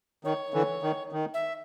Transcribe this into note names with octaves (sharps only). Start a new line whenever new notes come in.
D#3 C#5
D3 E3
D#3
D#3
E5